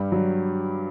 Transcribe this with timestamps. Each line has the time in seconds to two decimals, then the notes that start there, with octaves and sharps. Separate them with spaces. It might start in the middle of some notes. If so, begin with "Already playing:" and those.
Already playing: G2 G3
0.12 F#3